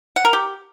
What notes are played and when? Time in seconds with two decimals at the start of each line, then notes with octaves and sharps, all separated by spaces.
0.16 F#5
0.25 A#4
0.33 G4